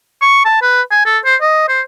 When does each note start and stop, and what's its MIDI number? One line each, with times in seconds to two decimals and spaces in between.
0.22 0.43 85
0.45 0.61 81
0.62 0.82 71
0.91 1.04 80
1.05 1.18 69
1.25 1.36 72
1.42 1.67 75
1.69 1.81 72